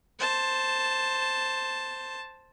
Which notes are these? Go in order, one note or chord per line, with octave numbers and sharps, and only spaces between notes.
C5 A5